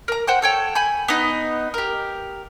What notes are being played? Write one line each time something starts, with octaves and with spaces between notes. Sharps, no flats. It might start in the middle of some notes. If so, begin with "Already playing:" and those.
A#4 A#5
C5 F#5 G5 F#6
A4 C#5 G5
G#5 B5 G6
B3 D#4 D#5
G4 A#4